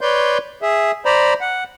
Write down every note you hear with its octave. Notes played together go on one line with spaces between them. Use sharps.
B4 C#5 D5 C6 G6
G#4 E5
C5 D5 A#5 B5
F#5